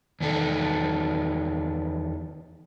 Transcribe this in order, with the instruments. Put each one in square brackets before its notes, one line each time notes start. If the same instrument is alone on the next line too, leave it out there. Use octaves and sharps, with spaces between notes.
[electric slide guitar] E2 D#3 A4